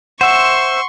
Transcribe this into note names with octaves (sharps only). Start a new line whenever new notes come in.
C5 E5 F#5 C6 C#6